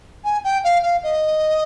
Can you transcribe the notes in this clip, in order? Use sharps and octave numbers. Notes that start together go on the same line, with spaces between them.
G#5
G5
F5
F5
D#5